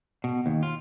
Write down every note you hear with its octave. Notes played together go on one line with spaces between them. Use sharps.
B2
D#2
F4